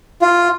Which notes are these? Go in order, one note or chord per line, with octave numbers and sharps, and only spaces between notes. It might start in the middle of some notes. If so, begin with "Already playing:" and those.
F4